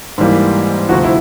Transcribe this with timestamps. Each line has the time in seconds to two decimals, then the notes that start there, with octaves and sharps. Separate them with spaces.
0.18 G#2 E3 G3 A#3
0.89 D2 C3 F3 F#4
1.04 E4